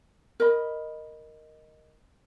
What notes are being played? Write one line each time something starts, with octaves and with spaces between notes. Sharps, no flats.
A#4 D#5 B5